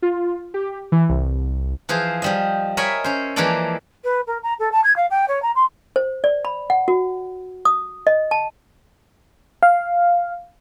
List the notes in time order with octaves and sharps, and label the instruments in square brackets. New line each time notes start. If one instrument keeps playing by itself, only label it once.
[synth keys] F4
G4
E3
C2
[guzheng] E3 F3 G#4 C5
F3 G3 D#5
A#4 C#5 D#5 E5 G#5 B5
C#4 C5
E3 F3 G#3 A#3 A4 D5
[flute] B4
A#4
A#5
A4
A5
G#6
F5
G5
C#5
A#5
C6
[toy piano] C5
D5
B5
F#5
F#4
D#6
D#5
A5
[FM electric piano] F5